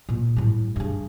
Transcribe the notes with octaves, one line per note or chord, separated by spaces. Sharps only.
A#2 F4
A2 G3
G2 C#3